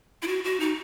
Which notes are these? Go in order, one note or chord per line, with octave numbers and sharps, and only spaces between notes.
E4
F#4
F#4
D#4